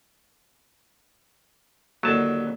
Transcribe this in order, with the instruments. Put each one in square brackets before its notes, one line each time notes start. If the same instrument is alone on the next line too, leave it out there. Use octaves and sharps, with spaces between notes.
[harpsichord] D#2 A2 D3 [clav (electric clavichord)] F#3 A5